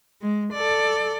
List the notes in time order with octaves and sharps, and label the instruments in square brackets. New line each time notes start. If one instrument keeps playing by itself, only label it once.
[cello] G#3
A4 D5